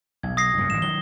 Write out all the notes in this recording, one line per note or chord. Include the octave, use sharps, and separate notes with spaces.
B1 G#6
D#6 A#6 C7
G2 A#2 C#3
A1 D3 E7
D#3 F#3 G7